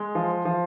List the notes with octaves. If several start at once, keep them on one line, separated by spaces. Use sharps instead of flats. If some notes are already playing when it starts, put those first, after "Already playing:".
Already playing: G#3
F3
F3